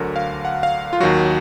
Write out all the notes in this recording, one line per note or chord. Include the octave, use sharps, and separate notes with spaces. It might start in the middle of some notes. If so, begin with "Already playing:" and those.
Already playing: D2 D3 F#3 A#4
F5
F#5
F5
F4
D#2 D#3 F#3 F#4